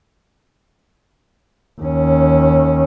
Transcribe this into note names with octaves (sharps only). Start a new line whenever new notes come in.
D#2 C#4